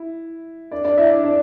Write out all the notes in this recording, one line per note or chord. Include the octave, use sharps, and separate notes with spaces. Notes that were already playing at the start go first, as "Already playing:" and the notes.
Already playing: E4
D4 D5
D4 D5
E4 E5
D4 D5
D4 D5